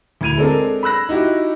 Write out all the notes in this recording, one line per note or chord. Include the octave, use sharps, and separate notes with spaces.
D2 E4 G#6 D#7 F7
G#3 C4 D4 A4 A#4
B5 E6 F#6 A#6
D#4 E4 F#4 G4